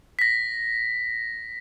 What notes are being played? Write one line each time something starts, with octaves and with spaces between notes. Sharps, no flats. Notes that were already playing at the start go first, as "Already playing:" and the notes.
A#6 B6